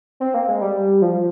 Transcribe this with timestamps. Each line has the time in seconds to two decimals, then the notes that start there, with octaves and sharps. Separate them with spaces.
0.20 C4
0.34 A#3
0.48 G#3
0.61 G3
1.02 F3